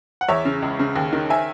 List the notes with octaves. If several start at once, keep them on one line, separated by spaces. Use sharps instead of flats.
F#5
E2 C#5 E5
C#3
C#2
C#3
D#2
D#3
E5 G#5